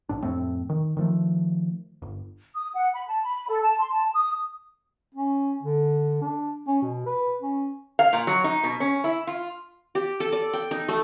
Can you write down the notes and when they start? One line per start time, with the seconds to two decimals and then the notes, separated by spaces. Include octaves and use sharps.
0.09 A#1 A2 D4
0.23 F2 A2 A3 C4
0.69 D#3
0.97 D#3 F3 A3
2.02 D1 G1
2.55 D#6
2.74 F#5
2.93 B5
3.08 A5
3.23 B5
3.49 A4
3.62 A5
3.80 C6
3.92 A5
4.15 D#6
5.15 C#4
5.63 D3
6.22 D4
6.68 C#4
6.82 B2
7.06 B4
7.42 C#4
7.99 F5
8.13 A#2
8.27 F#3
8.44 D#4
8.64 B2
8.80 C#4
9.04 E4
9.27 F4
9.95 G4
10.20 A4
10.32 D5
10.53 G5
10.71 D#4
10.88 A3